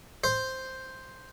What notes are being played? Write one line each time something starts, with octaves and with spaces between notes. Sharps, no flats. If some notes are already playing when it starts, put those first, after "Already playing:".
C5